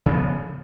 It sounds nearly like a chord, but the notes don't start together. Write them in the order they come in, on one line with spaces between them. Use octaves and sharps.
C#3 F3 B3